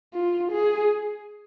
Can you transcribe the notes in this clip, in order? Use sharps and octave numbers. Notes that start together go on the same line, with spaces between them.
F4
G#4